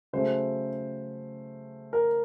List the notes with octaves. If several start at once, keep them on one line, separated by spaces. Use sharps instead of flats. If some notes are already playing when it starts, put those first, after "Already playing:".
C#3 F#3 A3 C5
A#4